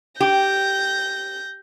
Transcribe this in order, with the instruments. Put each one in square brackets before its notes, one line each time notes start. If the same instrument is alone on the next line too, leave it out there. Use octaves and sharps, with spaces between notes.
[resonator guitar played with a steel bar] G4 [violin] G6 A#6